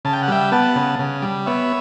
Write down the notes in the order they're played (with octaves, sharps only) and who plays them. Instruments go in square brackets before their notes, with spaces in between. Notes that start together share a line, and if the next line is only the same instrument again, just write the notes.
[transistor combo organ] C#3 A5
G5
F#5
G3 E5 G5
B3 F#5 A5
C#3
C#3
G3
B3 C#5 E5